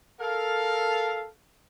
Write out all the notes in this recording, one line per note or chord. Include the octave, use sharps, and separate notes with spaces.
A4 A#4 F5